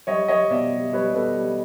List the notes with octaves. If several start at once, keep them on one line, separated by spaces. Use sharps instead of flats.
G3 C#5 D#5
G3 C#5 D#5
B2 D5 E5
G3
G3 B4 C#5
B2 A4 B4
G3